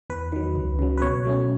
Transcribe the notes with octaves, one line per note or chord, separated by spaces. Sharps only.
E2 B4
D#3 F#3
C#2
C#3 F#3
B4
B2 C#5
F#3 A3 C#4